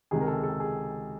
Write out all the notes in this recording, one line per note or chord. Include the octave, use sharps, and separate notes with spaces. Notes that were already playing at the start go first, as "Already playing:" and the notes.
C#2 C3 D#3 G#4
A#4
A4
A4
G#4